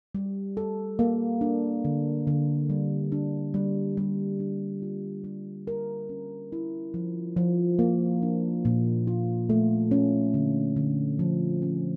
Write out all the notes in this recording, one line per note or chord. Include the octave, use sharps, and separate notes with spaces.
G3
A4
A#3
D4
D3
D3
G3
D4
G3
G3
D4
F4
G3
A#4
C#4
E4
F3
F3
A#3
D4
A#2
F4
A3
C#4
D3
D3
F3
C#4